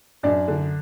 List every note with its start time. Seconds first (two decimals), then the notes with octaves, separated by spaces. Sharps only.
0.23 F#2 D4 D5
0.48 D3